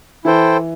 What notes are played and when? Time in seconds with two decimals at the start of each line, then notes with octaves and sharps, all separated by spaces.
0.24 E3 E4 A4 C5 G5